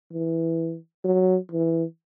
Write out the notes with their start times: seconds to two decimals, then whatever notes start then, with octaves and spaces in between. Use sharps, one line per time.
0.12 E3
1.05 F#3
1.52 E3